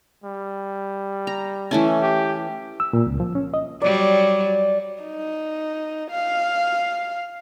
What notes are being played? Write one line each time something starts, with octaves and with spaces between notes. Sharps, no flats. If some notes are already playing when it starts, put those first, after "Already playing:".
G3
A#5
E3 A3 C#4
G4
E6
A#2
C#2
F3
C#4
D#5
F#3 G3 D5
D#4
F5